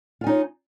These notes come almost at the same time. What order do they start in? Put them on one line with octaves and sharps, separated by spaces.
F4 G#5 D#4 C#5